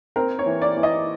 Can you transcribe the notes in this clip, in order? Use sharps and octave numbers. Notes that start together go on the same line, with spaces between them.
C4 A#4
C#5
E3
D5
E3
D#5